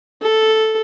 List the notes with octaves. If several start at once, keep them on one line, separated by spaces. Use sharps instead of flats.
A4